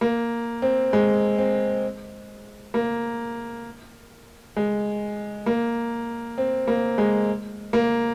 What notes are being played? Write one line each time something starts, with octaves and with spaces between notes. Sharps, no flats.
A#3
C4
G#3
C4
A#3
G#3
A#3
C4
A#3
G#3
A#3